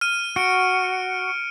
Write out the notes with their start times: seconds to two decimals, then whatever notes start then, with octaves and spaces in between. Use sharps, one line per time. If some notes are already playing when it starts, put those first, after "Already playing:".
0.01 F6 D#7
0.36 F#4 C#7 D7